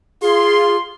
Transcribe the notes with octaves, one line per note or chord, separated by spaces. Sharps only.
F4 G#4 C6